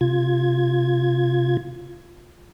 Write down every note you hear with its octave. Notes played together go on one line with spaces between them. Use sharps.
C3 F4 G#6